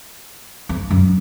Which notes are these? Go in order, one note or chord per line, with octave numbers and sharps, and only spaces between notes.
F2
F#2